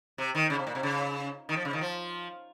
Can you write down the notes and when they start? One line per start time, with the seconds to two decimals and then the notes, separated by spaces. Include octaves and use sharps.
0.18 C3
0.35 D#3
0.50 C#3
0.59 C3
0.67 A#2
0.75 C3
0.83 C#3
1.49 D#3
1.56 F3
1.65 C#3
1.73 D#3
1.81 F3